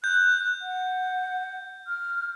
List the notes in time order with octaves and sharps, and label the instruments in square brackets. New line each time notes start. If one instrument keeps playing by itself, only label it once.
[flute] F#6 [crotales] G6
[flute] F#5
F6